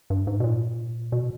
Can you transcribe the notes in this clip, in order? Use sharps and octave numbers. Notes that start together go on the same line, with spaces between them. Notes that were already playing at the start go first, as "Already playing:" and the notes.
G2
G#2
B2
A#2
B2